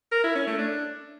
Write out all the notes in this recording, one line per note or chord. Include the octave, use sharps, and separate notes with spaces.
A#4
E4
C#4
A3
D4